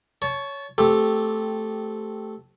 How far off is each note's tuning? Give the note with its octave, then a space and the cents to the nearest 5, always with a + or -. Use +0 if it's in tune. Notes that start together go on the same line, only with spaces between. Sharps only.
C#5 +10 A5 -20
A3 -5 C4 -10 G4 +0